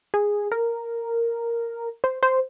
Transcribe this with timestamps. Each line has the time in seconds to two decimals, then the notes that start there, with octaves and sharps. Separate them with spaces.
0.14 G#4
0.52 A#4
2.04 C5
2.23 C5